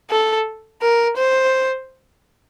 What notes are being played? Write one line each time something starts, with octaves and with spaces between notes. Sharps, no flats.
A4
A#4
C5